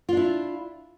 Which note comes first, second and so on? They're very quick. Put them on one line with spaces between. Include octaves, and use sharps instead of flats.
F4 D4 E4